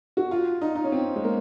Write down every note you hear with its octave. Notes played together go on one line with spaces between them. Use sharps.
F#4
F4
D#4
D#4
C#4
C4
G#3
A#3